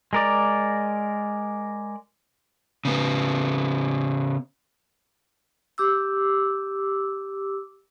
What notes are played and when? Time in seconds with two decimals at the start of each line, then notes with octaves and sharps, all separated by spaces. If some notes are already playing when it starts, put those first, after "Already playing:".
0.13 G#3 A#4 D5
2.85 C#3 B3
5.78 G4 D6 E6